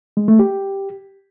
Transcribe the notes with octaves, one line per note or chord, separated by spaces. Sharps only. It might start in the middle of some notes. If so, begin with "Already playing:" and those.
G#3
A3
G4